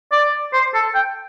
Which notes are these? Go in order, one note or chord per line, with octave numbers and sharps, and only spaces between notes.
D5
C5
A4
G5